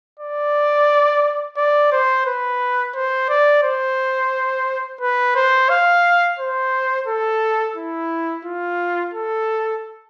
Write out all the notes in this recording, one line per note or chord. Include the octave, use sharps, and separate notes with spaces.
D5
D5
C5
B4
C5
D5
C5
B4
C5
F5
C5
A4
E4
F4
A4